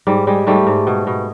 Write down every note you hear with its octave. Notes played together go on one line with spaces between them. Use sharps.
G#2 G3
G3 G#3
G#2 G3 A3
G#2
B2
B2